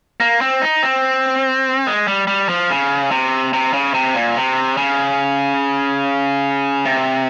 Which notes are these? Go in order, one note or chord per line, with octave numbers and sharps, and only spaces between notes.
A#3
C4
D#4
C4
G#3
G3
G3
F3
C#3
C3
C3
C#3
C3
A#2
C3
C#3
C3